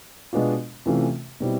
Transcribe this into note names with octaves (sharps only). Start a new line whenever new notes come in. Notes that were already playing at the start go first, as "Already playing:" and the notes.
B2 G#3 B3 D4 F4
C3 E3 A3 C#4 F4
B2 G3 C4 E4